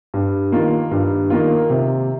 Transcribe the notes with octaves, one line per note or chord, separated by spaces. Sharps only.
G2
D#3 A#3 F4
G2
D#3 A#3 F4
C3